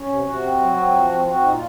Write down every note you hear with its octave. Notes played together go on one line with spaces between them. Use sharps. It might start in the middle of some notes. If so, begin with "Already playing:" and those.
Already playing: C#4
C3
C3 F#4
C4
F#3
C4
F3
C4
F4
C4 F#4
A#2 D#4
F4